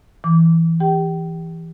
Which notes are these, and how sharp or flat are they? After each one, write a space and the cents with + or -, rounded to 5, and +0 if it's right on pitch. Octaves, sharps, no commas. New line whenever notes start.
E3 +0 D6 -20
G4 +20 G5 -30